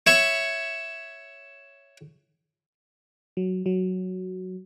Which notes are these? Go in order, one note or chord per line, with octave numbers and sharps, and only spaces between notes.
C#5 E5 B5 C#6
F#3
F#3